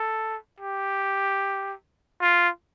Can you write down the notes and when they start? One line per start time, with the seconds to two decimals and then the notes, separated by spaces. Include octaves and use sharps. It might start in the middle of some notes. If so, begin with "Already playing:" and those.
Already playing: A4
0.61 G4
2.21 F4